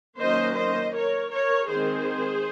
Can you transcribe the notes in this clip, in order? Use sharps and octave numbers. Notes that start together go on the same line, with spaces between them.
D#3 F#3 A#3 C#4 C5 D#5
C5 D#5
A#4 C#5
A#4 C#5
D#3 G#3 C4 G#4 C5